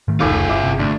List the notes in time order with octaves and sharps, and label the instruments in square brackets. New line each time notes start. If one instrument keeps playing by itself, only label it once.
[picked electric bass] G#2 D#3 A3
[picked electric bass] F1 C#2 [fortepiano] A2 D#3 D6 [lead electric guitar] F4 G#4
[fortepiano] A3
[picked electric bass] G1 [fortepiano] E4 D6
[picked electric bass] G1 C3
[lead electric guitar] D2 [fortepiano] D4